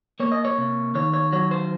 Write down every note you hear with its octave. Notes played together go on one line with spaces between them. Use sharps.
A#3 C#5
D#5
C#5
C3
D#3 C#5
C#5
F#3 C#5
C5